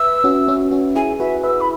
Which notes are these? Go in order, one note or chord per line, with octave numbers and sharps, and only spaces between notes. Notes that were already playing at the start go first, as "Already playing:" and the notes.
Already playing: B4 E5 E6
C#4 F#4
C#4 F#4
C#4 F#4
E4 G#4 G#5
F#4 B4 E5
B4 E5 E6
B5